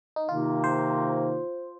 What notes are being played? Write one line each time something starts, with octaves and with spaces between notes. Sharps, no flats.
D#4
C3 D#3 A#3 D#4 F4
C5